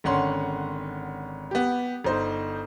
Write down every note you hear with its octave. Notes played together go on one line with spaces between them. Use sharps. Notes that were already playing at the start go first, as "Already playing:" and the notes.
G#1 D3 C#4 F#5 C6
B3 G4
G1 D#4 C5